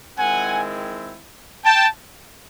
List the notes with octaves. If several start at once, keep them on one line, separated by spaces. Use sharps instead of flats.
D#3 G#3 C4 E4 F#5 G#5
G5 A5